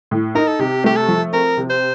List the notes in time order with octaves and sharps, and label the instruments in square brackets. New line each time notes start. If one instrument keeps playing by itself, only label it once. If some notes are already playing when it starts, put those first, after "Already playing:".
[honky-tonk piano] A2
[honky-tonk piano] D#4 [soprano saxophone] A#4
[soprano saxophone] A4
[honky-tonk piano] C3 [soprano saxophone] G4
[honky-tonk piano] A3 [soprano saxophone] G4
[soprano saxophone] A4
[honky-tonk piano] F3
[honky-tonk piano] C4 [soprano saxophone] A#4
[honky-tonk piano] C3
[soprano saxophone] C5